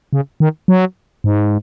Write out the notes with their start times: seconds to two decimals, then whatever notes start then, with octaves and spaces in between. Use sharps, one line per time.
0.13 C#3
0.40 D#3
0.68 F#3
1.24 G#2